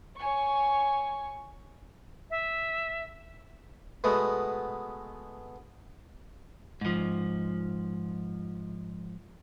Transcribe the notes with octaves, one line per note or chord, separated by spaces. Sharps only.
C#5 G#5 C#6
E5
B2 G#3 A3 B3
G#2 F3